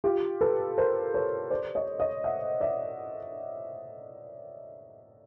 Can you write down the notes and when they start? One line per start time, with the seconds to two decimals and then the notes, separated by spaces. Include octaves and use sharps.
0.04 F4 G4
0.41 A4 B4
0.78 A#4 C5
1.14 B4 C#5
1.51 C5 D5
1.75 C#5 D#5
1.99 C#5 D#5
2.24 E5 F#5
2.61 D5 E5